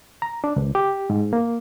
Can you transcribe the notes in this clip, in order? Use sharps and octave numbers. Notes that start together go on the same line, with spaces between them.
A#5
D4
C#2
G4
G#2
A#3